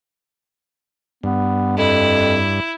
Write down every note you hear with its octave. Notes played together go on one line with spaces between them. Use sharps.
G2 B3
F2 E4